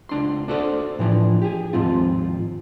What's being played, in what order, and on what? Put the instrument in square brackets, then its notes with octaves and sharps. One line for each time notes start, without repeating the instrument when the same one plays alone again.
[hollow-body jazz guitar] C#2 D4 C6
D4 F#4 A4 C5 D5
A2 E3 F3 D4
G4 G#4
D#2 G#2 F3 C4 F4